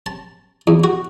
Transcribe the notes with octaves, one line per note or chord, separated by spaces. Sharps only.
A5
E2
F#4